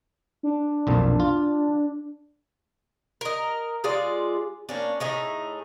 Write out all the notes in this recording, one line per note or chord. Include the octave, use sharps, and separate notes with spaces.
D4
B1 F2 A#2
F4
A#4 D#5
G#3 F4 G#4 D5
A#3 C#4 D4
A2 D#4 G#4